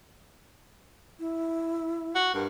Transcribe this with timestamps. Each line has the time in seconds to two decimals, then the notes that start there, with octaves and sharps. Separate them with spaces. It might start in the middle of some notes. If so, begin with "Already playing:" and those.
1.20 E4
2.15 F#4
2.34 G2 A#4